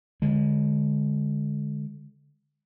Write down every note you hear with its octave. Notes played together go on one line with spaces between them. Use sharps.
D3 G#3